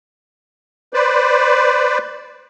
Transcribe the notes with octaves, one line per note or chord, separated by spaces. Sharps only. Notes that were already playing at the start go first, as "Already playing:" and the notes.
B4 C5 D5